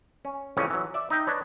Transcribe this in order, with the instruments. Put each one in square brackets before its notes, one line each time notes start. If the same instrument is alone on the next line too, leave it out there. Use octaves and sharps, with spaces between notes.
[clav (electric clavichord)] C#4
F2 A2 C#3 E3 G3 C#4
E3 F#3
D5 E5
D#4 E5 G5
D4 B4 C#5 D#5